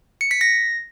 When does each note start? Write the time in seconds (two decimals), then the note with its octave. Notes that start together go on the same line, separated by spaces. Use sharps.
0.21 C#7
0.31 B6
0.41 A#6